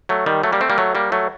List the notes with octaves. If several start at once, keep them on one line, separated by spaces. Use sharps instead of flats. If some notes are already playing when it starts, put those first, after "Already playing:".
F#3 A3
D#3 G3
F#3 A3
G3 A#3
A3 C4
G3 A#3
F#3 A3
G3 A#3
F#3 A3